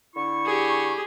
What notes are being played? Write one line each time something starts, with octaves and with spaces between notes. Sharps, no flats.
D3 E4 C#6
G4 G#4